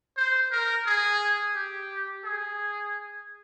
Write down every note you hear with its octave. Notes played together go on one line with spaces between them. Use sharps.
C5
A#4
G#4
G4
G#4